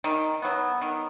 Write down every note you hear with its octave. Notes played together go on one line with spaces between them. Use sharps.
D#3
F#3 B3
D#3